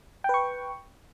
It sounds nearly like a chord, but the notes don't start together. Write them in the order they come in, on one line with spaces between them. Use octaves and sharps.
G5 B4 C#6